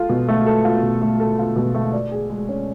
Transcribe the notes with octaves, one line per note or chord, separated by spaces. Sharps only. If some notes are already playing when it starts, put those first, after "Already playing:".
Already playing: F4 A4
B2
A3
A4
F4
B2
A3
A4
F4
B2
A3
D5
G#4
G#3
C#4